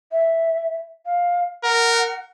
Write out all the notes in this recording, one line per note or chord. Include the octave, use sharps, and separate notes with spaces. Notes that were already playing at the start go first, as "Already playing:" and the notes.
E5
F5
A#4 F#5